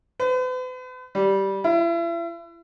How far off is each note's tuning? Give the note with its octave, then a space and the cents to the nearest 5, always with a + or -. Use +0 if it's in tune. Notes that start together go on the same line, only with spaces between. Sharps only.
B4 +45
G3 -10
E4 +40